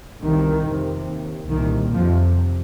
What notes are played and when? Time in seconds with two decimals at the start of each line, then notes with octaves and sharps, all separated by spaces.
0.22 C2 C3 D#3
0.65 F2 C3
1.07 D#2
1.51 C2 A#2 D#3
1.93 F2 C3 F3